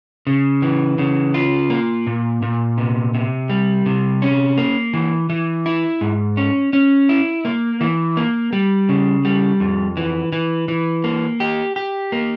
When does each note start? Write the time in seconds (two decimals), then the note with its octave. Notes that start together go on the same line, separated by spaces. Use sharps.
0.27 C#3
0.62 E3
0.98 C#3
1.34 F4
1.70 A#3
2.07 A#2
2.42 A#2
2.78 C3
3.14 C3
3.49 G3
3.86 C3
4.22 C#4
4.58 A#3
4.94 E3
5.30 E3
5.66 E4
6.01 G#2
6.37 C#4
6.73 C#4
7.09 E4
7.45 A#3
7.81 E3
8.17 A#3
8.53 G3
8.89 C#3
9.25 G3
9.60 F2
9.97 E3
10.32 E3
10.68 E3
11.04 A#3
11.40 G4
11.76 G4
12.12 A#3